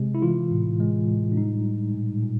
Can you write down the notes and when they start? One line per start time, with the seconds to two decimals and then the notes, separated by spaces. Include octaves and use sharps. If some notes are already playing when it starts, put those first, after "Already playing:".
Already playing: C3 G#3
0.15 E4
0.22 E3 F4
0.51 A2
0.80 G#3
1.08 A2
1.32 D4
1.37 G3 D#4
1.66 G3
1.94 A#2
2.23 A#2